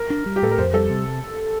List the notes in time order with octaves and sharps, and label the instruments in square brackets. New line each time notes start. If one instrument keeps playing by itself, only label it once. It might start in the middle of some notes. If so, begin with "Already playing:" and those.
Already playing: [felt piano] A#4
[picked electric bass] D4
G3
[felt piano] G4
[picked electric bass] A2 [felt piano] A4
[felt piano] A#4
[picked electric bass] F2 [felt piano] C5
[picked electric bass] G3 [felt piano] A4
[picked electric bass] C3